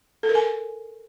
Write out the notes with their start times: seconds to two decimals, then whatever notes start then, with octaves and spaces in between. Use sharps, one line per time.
0.23 A4
0.29 A#4
0.35 G#5